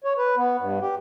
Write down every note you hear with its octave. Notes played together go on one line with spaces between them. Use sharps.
C#5
B4
B3
G2
G4